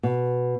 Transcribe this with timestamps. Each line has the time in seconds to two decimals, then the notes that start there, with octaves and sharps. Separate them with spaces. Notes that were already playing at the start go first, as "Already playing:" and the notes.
0.03 B2